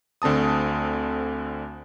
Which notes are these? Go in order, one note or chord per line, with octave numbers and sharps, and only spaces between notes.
D2 D3 C4 A5 D#6